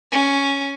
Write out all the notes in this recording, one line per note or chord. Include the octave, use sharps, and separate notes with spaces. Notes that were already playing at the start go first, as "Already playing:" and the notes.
C#4